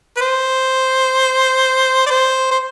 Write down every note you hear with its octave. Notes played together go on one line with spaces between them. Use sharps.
B4
C5
D5
C5
C5